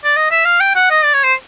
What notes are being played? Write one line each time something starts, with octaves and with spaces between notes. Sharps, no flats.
D5
D#5
E5
F5
G5
F#5
D#5
D5
C#5
C5